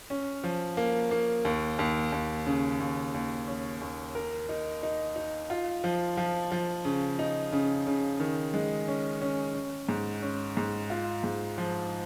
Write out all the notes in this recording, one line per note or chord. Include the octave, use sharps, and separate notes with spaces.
C#4
F3
A#3
A#3
D#2
D#2
D#2
C#3
D#2
D#2
C#4
D#2
A#4
D#4
D#4
D#4
F4
F3
F3
F3
C#3
D#4
C#3
C#3
D#3
G#3
C#4
C#4
C#4
G#2
C#4
G#2
F4
G#2
F3